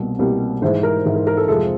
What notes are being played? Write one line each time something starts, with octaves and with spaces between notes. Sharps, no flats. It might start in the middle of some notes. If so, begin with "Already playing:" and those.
Already playing: C2 B2 G3 A#3
C2 B2 G3 A#3
G#2 E3 G#3 C5
A#4
G#2 E3 G#3
A#4
A#4
A4
F2 C3 F3 G#3 A4